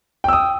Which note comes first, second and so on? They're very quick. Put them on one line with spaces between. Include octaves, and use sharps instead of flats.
G5 E6 D#6